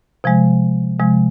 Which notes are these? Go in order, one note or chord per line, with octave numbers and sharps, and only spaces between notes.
C3 F3 G#3
C3 F3 G#3